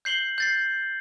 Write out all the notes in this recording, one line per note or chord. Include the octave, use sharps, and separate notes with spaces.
G6 C7 F#7 G7
G6 A6 C7